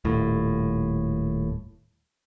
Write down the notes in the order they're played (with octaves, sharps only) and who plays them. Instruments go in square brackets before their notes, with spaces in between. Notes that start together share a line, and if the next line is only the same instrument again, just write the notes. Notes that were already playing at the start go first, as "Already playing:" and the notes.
[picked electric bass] D#1 A2